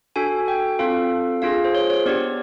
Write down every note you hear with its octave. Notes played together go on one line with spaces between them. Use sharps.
D4 F#4 A4 G#5
G5
C4 F4 A4 F5
D4 F4 G#4 F5
C5
C#5
C#5
B3 D4 G4 D5